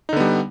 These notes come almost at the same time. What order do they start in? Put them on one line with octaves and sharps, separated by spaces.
D#4 D3 B3 G3